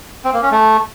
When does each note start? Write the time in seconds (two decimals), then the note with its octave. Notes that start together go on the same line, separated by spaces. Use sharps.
0.25 C4
0.34 A#3
0.42 C#4
0.51 A3